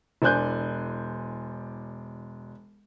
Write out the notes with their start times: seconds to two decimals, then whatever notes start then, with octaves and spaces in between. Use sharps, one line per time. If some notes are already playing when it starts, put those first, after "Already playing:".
0.22 E1 D4 C5 G#5 F#6 G6